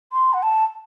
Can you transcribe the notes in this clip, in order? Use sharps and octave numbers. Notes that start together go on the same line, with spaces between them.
C6
F#5
A5